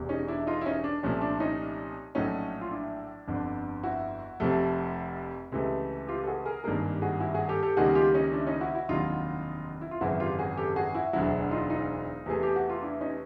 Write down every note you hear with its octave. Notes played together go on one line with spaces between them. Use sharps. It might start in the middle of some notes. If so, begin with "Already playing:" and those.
Already playing: E1 E2 C3
C#4 D#4
D4 E4
D#4 F4
E4
C#4 D#4
D4
C2 A#2 F3 A3 C#4
D4
C#4 D#4
A#1 A2 F#3 A3 C#4 D#4
F4
D4 E4
G1 F2 D3
E4 F#4
F1 F2 C3 F3 A3
C#2 C3 E3 A3
F4 G4
A4
F#4 G#4
G#4 A#4
G#1 G2 D#3 G3 A#3 G#4 A#4
F#4 G#4
E4 F#4
F#4 G#4
G4 A4
G4 A4
C#2 C3 D#3 G3 A#3 F#4 G#4
F4 G4
C#4 D#4
D4 E4
C#4 D#4
E4 F#4
E4 F#4
F1 D#2 D3 F#3 D#4 F4
E4
F4
G#1 F#2 C#3 E3 E4 F#4
F4 G4
F#4 G#4
G4 A4
F#4 G#4
E4 F#4
E1 D2 D3 F#3 E4 F#4
D#4 F4
D#4 F4
E2 C3 E3 A3 G#4
G4
F#4
F4
D4 E4
C#4 D#4